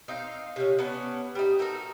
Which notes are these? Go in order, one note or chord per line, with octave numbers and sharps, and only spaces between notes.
C4 D#4 F5
C3 C#4
B3 C#4 D4
G3 D#4
D#4 F#4 A4 A#4